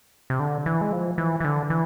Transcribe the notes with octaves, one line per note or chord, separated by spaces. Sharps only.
C3
D3
E3
G#3
F3
E3
E3
D3
E3